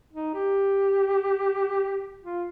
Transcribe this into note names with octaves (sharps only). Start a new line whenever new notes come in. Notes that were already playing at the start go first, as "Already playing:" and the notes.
D#4
G4
F4